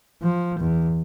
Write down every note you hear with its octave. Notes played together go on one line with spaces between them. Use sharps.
F3
E2